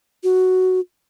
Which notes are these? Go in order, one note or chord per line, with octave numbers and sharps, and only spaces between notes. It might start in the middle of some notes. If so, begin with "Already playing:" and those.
F#4